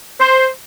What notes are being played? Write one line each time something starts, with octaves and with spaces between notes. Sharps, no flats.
C5